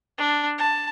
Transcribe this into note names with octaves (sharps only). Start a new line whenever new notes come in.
D4
A5